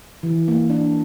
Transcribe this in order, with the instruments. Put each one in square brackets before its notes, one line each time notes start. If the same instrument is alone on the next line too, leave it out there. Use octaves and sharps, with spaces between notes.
[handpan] E3
A#3
D4